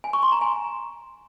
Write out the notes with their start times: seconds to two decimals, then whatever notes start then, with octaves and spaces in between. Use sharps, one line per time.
0.04 G#5
0.13 C#6
0.23 C6
0.32 A#5
0.41 G#5